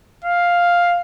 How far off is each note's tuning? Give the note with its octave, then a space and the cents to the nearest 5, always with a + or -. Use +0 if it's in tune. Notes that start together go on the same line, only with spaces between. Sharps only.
F5 +5